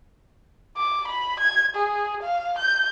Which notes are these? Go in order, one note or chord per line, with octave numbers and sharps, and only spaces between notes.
D6
B5
G#6
G#4
F5
G6